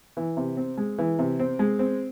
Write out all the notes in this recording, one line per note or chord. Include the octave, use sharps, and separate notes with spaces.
E3
C3
C4
G#3
E3
C3
C4
G#3
C4